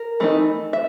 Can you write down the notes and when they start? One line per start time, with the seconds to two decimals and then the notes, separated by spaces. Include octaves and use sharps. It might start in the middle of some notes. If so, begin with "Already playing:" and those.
Already playing: A#4
0.20 E3 A3 C4 D#4
0.73 E5